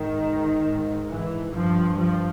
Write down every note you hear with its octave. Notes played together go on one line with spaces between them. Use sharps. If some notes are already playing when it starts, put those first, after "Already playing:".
Already playing: G#2 D#3
G#2
E3
G2 F3
F3